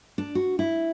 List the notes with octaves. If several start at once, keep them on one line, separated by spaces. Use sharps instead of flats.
D4
F#4
E4